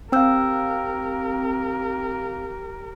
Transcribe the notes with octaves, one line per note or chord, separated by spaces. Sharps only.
C4 G4 A#4 F5 G5 E6 G6